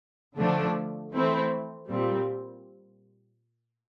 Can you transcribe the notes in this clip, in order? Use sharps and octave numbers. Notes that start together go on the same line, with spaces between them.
D3 F3 A3 D4
E3 A3 C4 E4
A#2 G3 C4